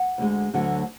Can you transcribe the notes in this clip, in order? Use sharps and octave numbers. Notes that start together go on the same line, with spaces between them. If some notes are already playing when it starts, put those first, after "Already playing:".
Already playing: F#5
D2 D3 G#3
D2 D3 F#3 A3